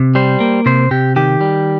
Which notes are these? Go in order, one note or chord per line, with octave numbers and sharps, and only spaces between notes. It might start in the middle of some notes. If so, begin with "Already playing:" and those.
Already playing: C3
G3 C5
A#3
C3 C5
C3 G4
D#3 G4
G3